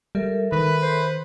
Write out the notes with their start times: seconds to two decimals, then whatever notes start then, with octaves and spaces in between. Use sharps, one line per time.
0.15 G3 A4 A#4 E5
0.52 D#3 B4
0.82 C5